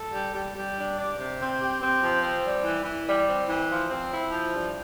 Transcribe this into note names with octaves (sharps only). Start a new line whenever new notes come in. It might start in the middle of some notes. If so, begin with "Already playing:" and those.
Already playing: A4
G3
G3
G3
D4
D5
C3
C4
G4
C4
F3
C4
G3
E3
E3
G3
C4
E3
F3
C4
E4
F3
G2